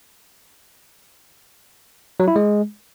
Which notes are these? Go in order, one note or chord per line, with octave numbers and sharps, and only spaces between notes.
F#3
E4
G#3